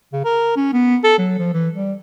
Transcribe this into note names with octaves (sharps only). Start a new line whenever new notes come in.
C#3
A#4
C#4
B3
A4
F#3
F3
E3
G3